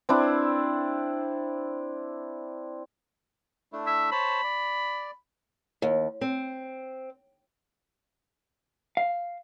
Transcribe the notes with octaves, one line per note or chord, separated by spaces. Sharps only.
C4 D4 E4
A3 D4 E4
E5
C5 C#5 A5 B5
D5
D#2
C4
F5